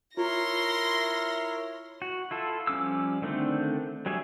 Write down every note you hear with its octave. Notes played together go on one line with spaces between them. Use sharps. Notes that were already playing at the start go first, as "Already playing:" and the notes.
E4 F4 A#4 C#5 C6 A#6
F#4
E4 F4 A4
F3 G3 C#4 D6 E6
D3 D#3 A3 C4 D4
F#3 G3 G#4 C#5 E5